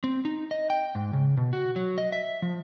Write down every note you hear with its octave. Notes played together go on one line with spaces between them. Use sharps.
C4
D#4
D#5
G5
G#2
C#3
B2
F#4
F#3
D#5
E5
F3